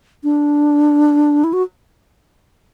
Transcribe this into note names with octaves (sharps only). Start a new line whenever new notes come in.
D4
E4
F#4